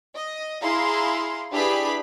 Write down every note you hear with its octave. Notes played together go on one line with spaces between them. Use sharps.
D#5
E4 G#4 F5 A#5 C6
D4 E4 G4 G#4 B4 B5